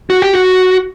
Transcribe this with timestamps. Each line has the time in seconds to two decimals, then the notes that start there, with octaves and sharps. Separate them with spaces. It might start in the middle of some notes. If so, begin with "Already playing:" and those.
0.10 F#4
0.22 G4
0.34 F#4